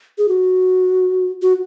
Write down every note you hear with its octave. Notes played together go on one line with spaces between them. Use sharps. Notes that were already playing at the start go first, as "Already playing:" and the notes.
G#4
F#4
F#4